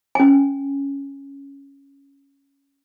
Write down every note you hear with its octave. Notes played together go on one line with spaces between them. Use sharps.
C#4 G#5